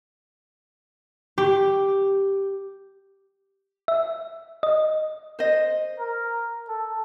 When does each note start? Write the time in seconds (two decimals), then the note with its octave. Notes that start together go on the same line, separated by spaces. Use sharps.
1.38 G4
3.88 E5
4.63 D#5
5.39 C5 D#5
6.00 A#4
6.69 A4